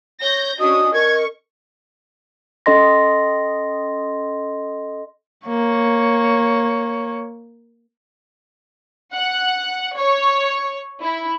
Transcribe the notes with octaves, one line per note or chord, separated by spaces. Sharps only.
C#5 G6 A#6
C#4 D4 F#4 D#5 D#6
A#4 C#6 G#6
C#4 A4 D#5 C6 A#6
A#3 C#5
F#5
C#5
E4